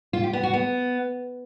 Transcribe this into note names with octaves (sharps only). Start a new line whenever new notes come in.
F4
G4
B3
F#4
B3